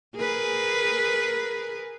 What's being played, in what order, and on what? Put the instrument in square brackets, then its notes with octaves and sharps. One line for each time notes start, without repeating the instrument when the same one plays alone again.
[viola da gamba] G#4 A#4 B4